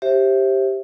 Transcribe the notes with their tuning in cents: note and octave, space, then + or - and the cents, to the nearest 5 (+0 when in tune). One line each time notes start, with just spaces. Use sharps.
G4 +0 C5 +30 E5 +0